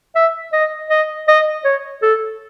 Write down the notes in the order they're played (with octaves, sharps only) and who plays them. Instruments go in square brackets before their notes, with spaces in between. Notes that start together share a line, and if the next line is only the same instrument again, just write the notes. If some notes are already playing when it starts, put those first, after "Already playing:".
[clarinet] E5
D#5
D#5
D#5
C#5
A4